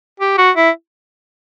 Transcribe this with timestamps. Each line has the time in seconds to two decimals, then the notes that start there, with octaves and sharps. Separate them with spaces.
0.20 G4
0.38 F#4
0.57 E4